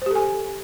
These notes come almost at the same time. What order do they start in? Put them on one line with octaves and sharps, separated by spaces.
C5 G4 A4 G#5